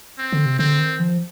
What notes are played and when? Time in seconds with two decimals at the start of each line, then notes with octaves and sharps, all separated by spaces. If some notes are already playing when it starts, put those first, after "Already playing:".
0.19 C4
0.33 D3
0.46 C3
0.59 D3 C4
0.79 D#3
0.99 F3